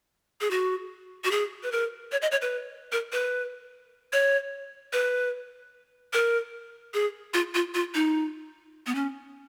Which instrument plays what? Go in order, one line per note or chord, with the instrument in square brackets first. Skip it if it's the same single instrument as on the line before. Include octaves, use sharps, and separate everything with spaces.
[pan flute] G#4
F#4
F#4
G#4
B4
A#4
C#5
D#5
C#5
B4
A#4
B4
C#5
B4
A#4
G#4
F4
F4
F4
D#4
B3
C#4